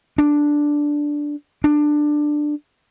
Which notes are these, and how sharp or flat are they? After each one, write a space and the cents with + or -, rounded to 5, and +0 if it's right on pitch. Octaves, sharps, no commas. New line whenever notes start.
D4 +0
D4 +15